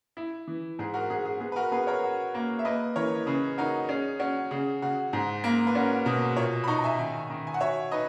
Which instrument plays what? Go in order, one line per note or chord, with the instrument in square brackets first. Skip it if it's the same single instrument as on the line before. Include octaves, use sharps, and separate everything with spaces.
[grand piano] E4
E3
[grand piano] G#2 [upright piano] G#4
[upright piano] F#4 A#4
[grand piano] G#2 [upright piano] G#4
[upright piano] G#4
[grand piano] B3 [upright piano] G#4
[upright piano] B4
F#4 A#4
[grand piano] B3 [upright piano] G#4 B4
[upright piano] A#4 C#5
[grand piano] F#4
A#3
[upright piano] E5
[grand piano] A#3 [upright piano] B4 D#5
[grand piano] E3 [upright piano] A#4 C#5
[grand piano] C#3 [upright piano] G#4 B4
[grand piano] D#4 [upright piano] F#4 A#4
[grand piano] C#4 [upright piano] G#4
[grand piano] C#4 [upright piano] F#4
[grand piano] C#3 [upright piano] G#4
[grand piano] C#3 [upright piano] F#4
[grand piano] G#2 [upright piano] G#4
[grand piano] A#3
[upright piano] B4
[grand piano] C#4 [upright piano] F#4 A#4
[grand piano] B2 [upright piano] F#4 A#4
[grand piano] A#2 [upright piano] A#4 C#5
[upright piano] B5
[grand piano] D#4 [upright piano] A#5 C#6
[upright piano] A#5
E5 G#5
[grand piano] D#3
D#3
[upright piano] G#5
F#5
[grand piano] F#4 [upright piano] C#5 E5
[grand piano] D#4 [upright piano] B4 D#5